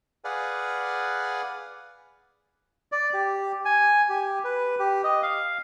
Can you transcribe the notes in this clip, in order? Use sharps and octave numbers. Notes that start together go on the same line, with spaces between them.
G#4 B4 D5 F5 F#5 G#5
D5
G4
G#5
G4
B4
G4
D#5
F5